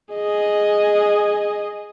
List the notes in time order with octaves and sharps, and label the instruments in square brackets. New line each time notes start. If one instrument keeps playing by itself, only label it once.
[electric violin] G#4 D#5